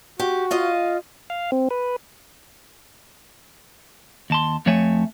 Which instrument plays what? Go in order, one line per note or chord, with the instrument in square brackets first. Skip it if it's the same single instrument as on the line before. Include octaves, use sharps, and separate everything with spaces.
[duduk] F#4 [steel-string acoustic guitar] G4
[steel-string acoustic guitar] F4 D#5 F5
[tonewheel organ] F5
C4
B4
[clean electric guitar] D#2 A5 C6
F2 F3 A3 C#5 E5 G#5